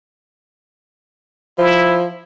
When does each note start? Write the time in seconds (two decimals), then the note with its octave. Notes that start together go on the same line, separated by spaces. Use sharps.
1.58 F3 E4